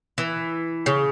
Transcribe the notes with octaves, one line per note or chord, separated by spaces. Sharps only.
E3
C#3